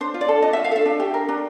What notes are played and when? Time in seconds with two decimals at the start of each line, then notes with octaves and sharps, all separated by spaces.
0.01 D4 C5
0.14 F4
0.21 D5
0.28 A4
0.42 D4 D#5
0.53 E5
0.57 F4
0.64 F5
0.71 A4 E5
0.86 D4
1.00 G4
1.14 A#4
1.29 D4